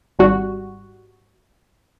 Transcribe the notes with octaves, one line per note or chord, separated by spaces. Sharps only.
G#1 G3 F#4